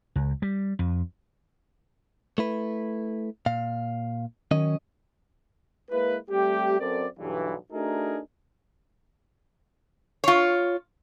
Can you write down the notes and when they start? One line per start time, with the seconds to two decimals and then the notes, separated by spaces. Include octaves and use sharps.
0.16 C#2
0.42 G3
0.79 F2
2.38 A3 E4 B4
3.46 A#2 F5
4.51 D#3 F#3 C#4 D#5
5.91 G#3 A#3 E4 B4
6.30 G3 A3 C4 G4
6.80 F#2 C4 A4 A#4 D5
7.19 B1 G2 E3
7.72 A3 D4 D#4 F#4 G#4 A#4
10.24 F4 C#5